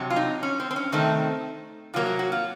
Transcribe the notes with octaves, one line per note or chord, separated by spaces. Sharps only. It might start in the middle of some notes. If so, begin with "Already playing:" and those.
Already playing: F2 C3 F#3
F4
D#4
C#4
C4
C4
C#4
C3 D#3 A3 C4 D#4
C3 F#3 A#3 F4
F#4
F#4
F4